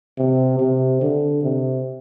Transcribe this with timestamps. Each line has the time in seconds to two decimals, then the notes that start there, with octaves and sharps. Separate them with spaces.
0.18 C3
0.59 C3
1.01 D3
1.43 C3